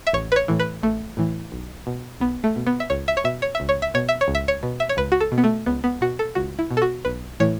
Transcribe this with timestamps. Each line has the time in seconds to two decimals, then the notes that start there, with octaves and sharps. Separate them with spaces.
0.07 E5
0.13 A1 C#5
0.32 B4
0.36 C#5
0.48 A2 E3
0.60 B4
0.83 A1 A3
1.17 A2 E3
1.52 B1
1.87 B2
2.20 B1 B3
2.44 A3
2.56 B2
2.67 B3
2.80 E5
2.90 C#2 C#5
3.08 E5
3.17 C#5
3.24 B2 E5
3.42 C#5
3.55 E5
3.60 C#2
3.69 C#5
3.82 E5
3.94 B2 C#5
4.09 E5
4.21 C#5
4.28 C#2
4.35 E5
4.48 C#5
4.63 B2
4.80 E5
4.89 C#5
4.97 C#2 B4
5.12 F#4
5.20 A4
5.32 B2
5.38 B3
5.44 A3
5.66 C#2 B3
5.84 B3
6.01 B2 F#4
6.19 A4
6.35 C#2 F#4
6.59 E4
6.71 B2
6.77 A4
6.82 F#4
7.05 B1 B4
7.40 A2 E3 C#5